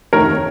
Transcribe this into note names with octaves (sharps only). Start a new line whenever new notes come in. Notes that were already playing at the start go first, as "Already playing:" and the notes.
F1 D#2 D#3 A3 A#4 C#5